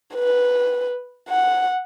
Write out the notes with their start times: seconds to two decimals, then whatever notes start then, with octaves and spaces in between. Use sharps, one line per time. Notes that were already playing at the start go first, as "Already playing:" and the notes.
0.14 B4
1.29 F#5